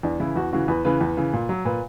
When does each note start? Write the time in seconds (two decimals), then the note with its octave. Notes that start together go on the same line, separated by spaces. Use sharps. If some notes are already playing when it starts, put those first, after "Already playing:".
0.03 E2 D4
0.20 C#3 E3 E4
0.36 E2 F#4
0.52 C#3 E3 F#4
0.68 E2 B4
0.85 C#3 E3 B4
1.01 E2
1.17 C#3 E3
1.33 A#2
1.49 F#3
1.65 A#2 B4